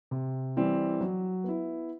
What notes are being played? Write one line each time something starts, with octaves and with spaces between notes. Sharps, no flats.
C3
E3 G3 C4
F#3
B3 E4